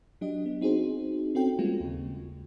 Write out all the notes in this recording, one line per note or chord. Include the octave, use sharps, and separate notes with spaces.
F#3 D4 G4 D#5
B3
C4 D#4 F#4 G#4 C5
C4 C#4 F#4 A4 G5
G3 G#3 A#3 F4 F#4
D#2 C#3